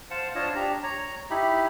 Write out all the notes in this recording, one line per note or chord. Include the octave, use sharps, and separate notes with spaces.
C5 F5 F#5 A5
D4 F4 C5 C#5 D#5 A5
D4 G4 A#5
C#5 A#5
D#4 E4 G4 B5